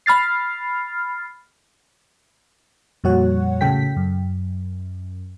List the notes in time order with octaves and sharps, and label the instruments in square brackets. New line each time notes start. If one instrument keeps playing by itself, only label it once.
[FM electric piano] B5 F6 A6 C7
F2 A#2 G3 F#4 C#5 F#5
A2 C#3 A4 G5 B6
F#2